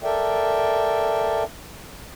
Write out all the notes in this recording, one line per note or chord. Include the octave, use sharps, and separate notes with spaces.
A4 A#4 D5 E5 G5